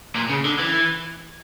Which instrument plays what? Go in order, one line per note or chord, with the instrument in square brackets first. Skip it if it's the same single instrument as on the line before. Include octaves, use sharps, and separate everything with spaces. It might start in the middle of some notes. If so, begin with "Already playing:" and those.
[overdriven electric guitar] A#2
C#3
D3
E3